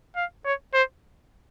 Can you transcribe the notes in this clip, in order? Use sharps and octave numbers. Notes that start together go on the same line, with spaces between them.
F5
C#5
C5